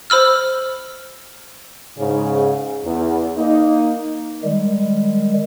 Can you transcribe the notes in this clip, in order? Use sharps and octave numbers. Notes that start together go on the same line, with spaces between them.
C5 B5 E6 F6
G#2 C#3
E2
A#3 D#4
D#3 G3 G#3